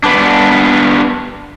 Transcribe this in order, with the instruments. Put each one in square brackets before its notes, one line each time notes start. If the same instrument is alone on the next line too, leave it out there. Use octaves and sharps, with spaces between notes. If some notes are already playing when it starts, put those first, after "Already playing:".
[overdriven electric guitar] B3 D4